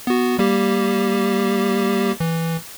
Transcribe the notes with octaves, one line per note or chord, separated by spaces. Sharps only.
B3 F#4
G3 A#3 G4
E3